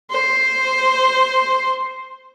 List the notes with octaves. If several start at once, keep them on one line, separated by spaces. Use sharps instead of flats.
C5 C6